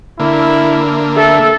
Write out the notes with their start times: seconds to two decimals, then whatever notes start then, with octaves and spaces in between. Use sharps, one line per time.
0.20 D3 A#3 E4
1.17 A4 E5